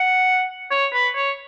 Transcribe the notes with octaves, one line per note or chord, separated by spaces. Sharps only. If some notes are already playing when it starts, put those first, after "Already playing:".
Already playing: F#5
C#5
B4
C#5